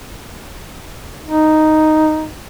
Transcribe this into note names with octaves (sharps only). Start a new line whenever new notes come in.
D#4